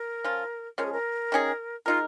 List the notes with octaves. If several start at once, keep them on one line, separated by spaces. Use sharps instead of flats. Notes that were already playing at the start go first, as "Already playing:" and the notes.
Already playing: A#4
F3 C#4 F4
F3 G#3 C#4 A#4
G#4
A#4
D#3 C#4 G#4
G#3 D#4 F4 A#4